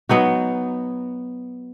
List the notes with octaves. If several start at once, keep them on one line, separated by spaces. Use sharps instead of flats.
F#3 B3 D#4 F#4